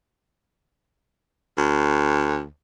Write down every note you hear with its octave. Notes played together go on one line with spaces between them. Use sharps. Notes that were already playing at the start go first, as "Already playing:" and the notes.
D2